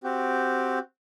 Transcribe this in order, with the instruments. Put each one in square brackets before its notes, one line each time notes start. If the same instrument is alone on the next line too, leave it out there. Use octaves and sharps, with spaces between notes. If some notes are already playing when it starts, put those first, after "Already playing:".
[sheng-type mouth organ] C4 F#4 G4